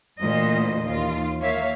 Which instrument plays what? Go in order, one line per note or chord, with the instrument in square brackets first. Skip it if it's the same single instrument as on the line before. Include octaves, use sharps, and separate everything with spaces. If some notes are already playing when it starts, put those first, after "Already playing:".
[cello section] D2 A#2 E3 C5 D#5
D#2 E3 F4
A#3 C#5 E5 F5